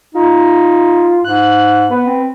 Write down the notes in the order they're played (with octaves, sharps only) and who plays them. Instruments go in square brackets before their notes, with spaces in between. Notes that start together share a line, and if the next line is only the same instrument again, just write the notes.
[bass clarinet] D#4 [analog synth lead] F4
[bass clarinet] G#2 [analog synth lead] F#6
[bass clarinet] B3 [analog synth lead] B4
[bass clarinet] C4